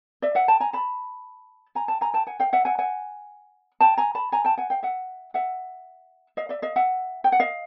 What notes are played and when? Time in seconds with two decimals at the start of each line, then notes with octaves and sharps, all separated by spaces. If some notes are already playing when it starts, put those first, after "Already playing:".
0.22 D5 E5
0.35 E5 F#5
0.48 G5 A5
0.60 G#5 A#5
0.73 A5 B5
1.75 G#5 A#5
1.88 G5 A5
2.01 G#5 A#5
2.14 G5 A5
2.27 F#5 G#5
2.40 F5 G5
2.53 E5 F#5
2.65 F#5 G#5
2.79 F#5 G#5
3.80 G5 A5
3.98 G#5 A#5
4.15 A5 B5
4.32 G#5 A#5
4.45 G5 A5
4.58 F#5 G#5
4.70 F5 G5
4.83 E5 F#5
5.34 E5 F#5
6.37 D#5 F5
6.49 D5 E5
6.62 D#5 F5
6.76 E5 F#5
7.24 G5
7.32 F#5
7.40 D#5 F5